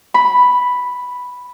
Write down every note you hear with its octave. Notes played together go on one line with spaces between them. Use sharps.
B5